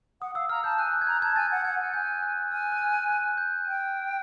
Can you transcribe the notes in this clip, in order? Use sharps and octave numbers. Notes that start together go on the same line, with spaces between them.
F#5 D#6
F5 E6
A#5 F6
A5 G6
G#5 F#6
F#6
G#6
A#5 G6
A5 G#6
G#5 A6
F#5
F#5 G#6
G#5
G#5 G6
F#6
G#5 F6
F#6
F6
F#6
G6
G5